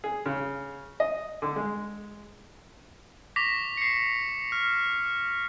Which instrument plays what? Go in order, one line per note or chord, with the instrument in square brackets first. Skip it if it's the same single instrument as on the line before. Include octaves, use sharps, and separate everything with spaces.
[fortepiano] G#4
C#3
D#5
D3
G#3
[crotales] C#6 D6 A#6 B6
C7 C#7
F6